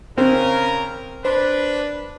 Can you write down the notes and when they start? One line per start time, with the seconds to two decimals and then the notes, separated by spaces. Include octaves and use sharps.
0.18 C#3 C4 A#4
1.25 D4 B4 C5